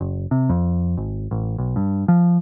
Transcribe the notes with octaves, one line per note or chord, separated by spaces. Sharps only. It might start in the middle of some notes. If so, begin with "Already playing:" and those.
F#1
C3
F2
G#1
A1
B1
G2
F3